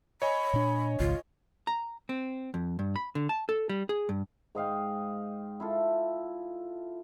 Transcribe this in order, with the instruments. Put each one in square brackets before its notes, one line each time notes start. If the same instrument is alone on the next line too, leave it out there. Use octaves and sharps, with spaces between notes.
[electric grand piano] C#5 D#5 G#5 [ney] B5
[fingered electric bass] A#2 D4
[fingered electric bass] G#1 C#2 [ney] F4
[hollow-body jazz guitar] A#5
C4
F2
G2
B5
D3
A5
A4
G3
G#4
G2
[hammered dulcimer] G#2 D#5 F5 G5
E4 F4 A4